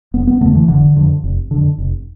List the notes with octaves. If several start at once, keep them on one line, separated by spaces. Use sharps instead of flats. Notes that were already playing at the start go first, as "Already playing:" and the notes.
F1 B3
B3
F2 D3 A3
E3
F1 D3
F2 D3
F1
F2 D3
F1